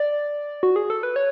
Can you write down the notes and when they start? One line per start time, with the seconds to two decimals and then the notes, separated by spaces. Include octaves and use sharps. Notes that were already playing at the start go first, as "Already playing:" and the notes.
Already playing: D5
0.63 F#4
0.76 G#4
0.90 A4
1.03 B4
1.16 C#5